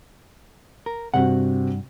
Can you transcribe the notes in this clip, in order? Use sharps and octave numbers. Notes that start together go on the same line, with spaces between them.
A#4
G2 C3 C4 F#4 F#5